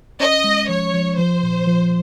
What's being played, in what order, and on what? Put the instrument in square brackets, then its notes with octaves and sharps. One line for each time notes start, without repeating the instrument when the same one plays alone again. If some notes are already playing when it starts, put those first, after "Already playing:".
[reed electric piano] C#4 [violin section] D#5
[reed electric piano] G#3
[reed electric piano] F3 [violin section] C#5
[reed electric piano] F3
[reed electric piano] F3 [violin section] C5
[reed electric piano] A#2
F3